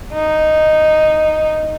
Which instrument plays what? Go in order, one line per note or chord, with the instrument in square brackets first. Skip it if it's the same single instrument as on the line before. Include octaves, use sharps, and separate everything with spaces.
[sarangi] D#4